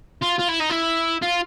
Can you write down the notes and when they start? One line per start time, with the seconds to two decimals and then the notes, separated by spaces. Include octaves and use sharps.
0.22 F4
0.39 F4
0.49 E4
0.61 D#4
0.71 E4
1.22 F4